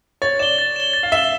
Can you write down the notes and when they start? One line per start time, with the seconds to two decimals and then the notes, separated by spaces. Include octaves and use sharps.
0.22 C#5 A6
0.39 D5 E7 G7
0.58 A6
0.76 E7 G7
0.93 A6
1.03 F5
1.12 E5 E7 G7